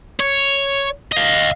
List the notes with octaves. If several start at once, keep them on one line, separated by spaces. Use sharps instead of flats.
C#5
D#5 F5